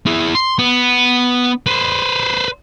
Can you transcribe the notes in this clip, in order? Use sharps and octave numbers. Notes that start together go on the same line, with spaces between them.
E4 G#4
C6
B3
B4 C5